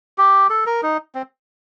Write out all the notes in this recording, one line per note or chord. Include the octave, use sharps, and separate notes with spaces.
G4
A4
A#4
D#4
C4